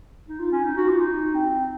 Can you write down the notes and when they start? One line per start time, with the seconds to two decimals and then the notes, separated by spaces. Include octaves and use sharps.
0.28 D#4
0.39 F4
0.52 C#4
0.64 D#4
0.77 F#4
0.89 F4
0.99 D#4
1.34 C4